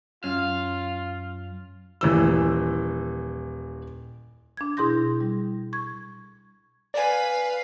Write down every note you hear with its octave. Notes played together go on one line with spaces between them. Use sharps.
F#2 C#4 F4 F5
D#1 E3 E6
D4 G#6
B2 E4 G#4 C6 G6 A#6
G3
C#6 G#6
B4 D5 F5 G#5